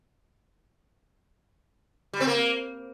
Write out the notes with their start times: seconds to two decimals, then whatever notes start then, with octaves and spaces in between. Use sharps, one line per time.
2.13 G3
2.20 C4
2.27 A#3